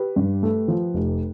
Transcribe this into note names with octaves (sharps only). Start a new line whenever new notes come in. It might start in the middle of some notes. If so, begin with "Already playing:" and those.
Already playing: G4 B4
G2
A3
F3
F1